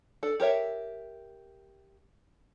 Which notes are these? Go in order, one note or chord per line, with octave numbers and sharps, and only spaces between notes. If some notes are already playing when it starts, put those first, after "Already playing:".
D4 A4
G4 A#4 C#5 E5